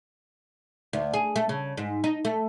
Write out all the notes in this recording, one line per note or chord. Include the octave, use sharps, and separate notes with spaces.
D2
G#4
A3
C#3
G#2
D#4
A3